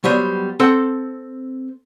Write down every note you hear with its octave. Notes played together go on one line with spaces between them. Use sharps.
F#3 G3 B3 C5
C4 A4 F#5 G5